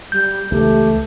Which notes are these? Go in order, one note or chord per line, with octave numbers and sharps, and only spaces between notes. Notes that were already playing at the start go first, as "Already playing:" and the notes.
G3 G6
C#2 E3 A3 G4